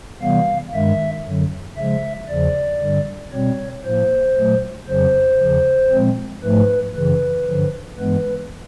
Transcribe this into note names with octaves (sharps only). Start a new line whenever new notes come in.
C3 E3 G3 B3 F5
G2 D#3 G#3 E5
F#2 D3 F#3
C#3 F3 G#3 E5
E2 C#3 F3 D5
G2 D3 G3
B2 G3 C4 C#5
A2 F3 A#3 C5
A#2 F#3 A3
F2 C#3 F#3 C5
E2 C#3 F3
A#2 F3 G#3 C4
G#2 F3 A3 B4
F#2 C#3 E3 B4
G2 D3 F3
G2 E3 G#3 B3 B4